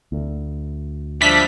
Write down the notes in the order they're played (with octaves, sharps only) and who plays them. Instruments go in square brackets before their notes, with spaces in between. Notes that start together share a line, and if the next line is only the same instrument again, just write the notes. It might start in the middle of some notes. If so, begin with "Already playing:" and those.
[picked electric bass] D2
[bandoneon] F3 D4 E5 [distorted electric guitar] G3 [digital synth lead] B6